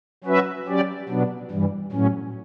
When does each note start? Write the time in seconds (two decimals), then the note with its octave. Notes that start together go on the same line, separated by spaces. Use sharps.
0.24 F#3 C#4 F#4 B4 E5
0.66 F#3 C#4 G4 D5
1.08 B2 F#3 B3 D4
1.50 G2 E3 G3
1.92 A2 F#3 C#4